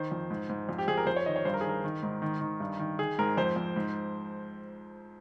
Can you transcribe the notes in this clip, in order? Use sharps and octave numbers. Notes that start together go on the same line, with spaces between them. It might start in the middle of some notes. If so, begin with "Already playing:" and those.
Already playing: D#3 C5
F2
G#2
G#2
F2
G4
F2 G#4
A#4
F2 C5
C#5
D#3 D#5
C#5
G2 C5
A#4
G#4
D#3 A#4
D#3
G#2
D#3
D#3
G2
D#3
D#3 G#4
G#2 A#4
F2 C5
F2
G#2